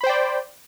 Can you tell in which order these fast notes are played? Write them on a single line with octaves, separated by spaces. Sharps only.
B5 C5 G5 D5